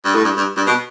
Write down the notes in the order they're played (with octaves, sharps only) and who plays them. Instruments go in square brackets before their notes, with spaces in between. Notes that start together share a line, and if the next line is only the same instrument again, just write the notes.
[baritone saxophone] G2
A2
G2
G2
G2
B2